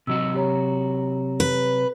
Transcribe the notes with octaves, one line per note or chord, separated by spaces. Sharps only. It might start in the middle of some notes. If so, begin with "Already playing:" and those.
C3 F#3 F#4 D#5 E6
G4 C#5 A#5
B4